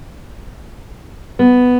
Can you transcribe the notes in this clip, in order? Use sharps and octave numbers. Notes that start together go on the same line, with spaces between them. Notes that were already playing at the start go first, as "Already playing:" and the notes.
B3